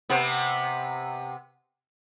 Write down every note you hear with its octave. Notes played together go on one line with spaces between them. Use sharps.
C3 B3